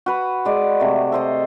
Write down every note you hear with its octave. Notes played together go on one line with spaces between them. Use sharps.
F#4 B4
G#3 D5
C3 A3
A4 C5 D#5